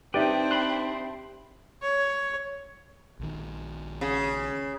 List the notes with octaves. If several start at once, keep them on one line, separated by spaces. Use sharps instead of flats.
C4 D4 D#4 G4 B4 D5 E5 G5
B5 C6 F#6
C#5
A#1 D#3
C#3